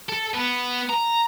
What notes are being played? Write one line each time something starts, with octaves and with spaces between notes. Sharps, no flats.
A4
B3
A#5